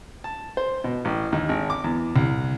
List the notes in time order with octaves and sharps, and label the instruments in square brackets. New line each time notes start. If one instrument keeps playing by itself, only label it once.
[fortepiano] A5
C5
B2
A1
D#2
G#1
D6
E2
C2